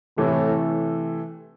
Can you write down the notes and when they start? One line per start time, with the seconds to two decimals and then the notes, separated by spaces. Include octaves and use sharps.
0.18 A2 C3 E3 A3